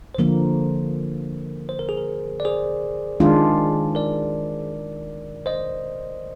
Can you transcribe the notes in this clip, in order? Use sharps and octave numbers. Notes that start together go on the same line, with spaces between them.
C5
D3 F3 A#3 A#4
C5
A#4
G#4
A#4
D5
G#4 C5
D#3 G#3 D4 F4
A#4 D5
C5 D#5